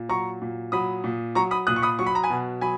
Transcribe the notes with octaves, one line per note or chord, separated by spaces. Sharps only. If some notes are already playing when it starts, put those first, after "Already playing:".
Already playing: A#2
F#3 A#5 C#6
A#2
F#3 B5 D#6
A#2
F#3 A#5 C#6
B5 D#6
A#2 D#6 F#6
C#6
B5 D#6
F#3 C#6
B5
A#5
G#5 B5
B2
F#3 G#5 B5